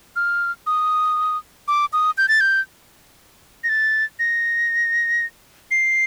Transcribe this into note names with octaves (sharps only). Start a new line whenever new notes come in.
F6
D#6
D6
D#6
G6
A6
G6
A#6
A6
A#6
C7